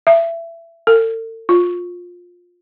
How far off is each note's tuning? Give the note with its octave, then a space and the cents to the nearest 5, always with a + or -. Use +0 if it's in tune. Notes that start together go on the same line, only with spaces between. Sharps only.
E5 +20
A4 +40
F4 +15